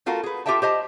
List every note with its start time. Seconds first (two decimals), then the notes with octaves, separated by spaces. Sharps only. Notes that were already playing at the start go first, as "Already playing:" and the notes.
0.06 A3 F4 F#4 A4 A#4
0.23 G#4 B4
0.46 F4 G4 A4 E5 G5 A5
0.62 G4 C5 D#5 A5